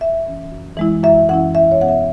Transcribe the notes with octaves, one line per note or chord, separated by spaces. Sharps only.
F#2 E5
E3 C#4
F#2
E3 G#3 E4
F#2 E5
E3 C#4 E4 F#5
E2 E5
C#5
B2 B3 F#5
E5